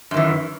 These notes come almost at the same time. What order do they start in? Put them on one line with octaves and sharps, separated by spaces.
F#2 D#3 E3